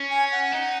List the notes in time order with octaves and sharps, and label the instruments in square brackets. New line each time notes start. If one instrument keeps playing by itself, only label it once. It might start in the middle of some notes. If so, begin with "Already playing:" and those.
Already playing: [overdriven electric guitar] C#4
[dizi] G#5
F#5
[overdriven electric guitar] D#4